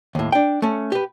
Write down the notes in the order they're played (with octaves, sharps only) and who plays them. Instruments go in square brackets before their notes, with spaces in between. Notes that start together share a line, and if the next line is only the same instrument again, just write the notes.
[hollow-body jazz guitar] D#2 A2
D4 G5
A3 C#4
G4 B4